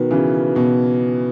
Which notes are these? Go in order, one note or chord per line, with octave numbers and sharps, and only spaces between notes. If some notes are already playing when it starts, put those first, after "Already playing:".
Already playing: B2 D#3 F#4 B4
C#3 E3 F#4
B4
B2 E4